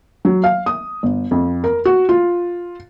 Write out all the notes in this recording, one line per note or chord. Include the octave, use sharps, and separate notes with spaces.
F#3
F5
D#6
G1
F2
A#4
F#4
F4